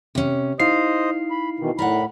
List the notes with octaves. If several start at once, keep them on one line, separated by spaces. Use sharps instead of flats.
C3 C#4
D#4 E4 C5 D#5 F5 D#6 C7
B5
B2 D#3 E3
A2 A#4 D5 F#5 B5